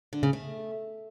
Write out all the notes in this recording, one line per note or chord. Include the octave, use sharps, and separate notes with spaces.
D3
C#3
A3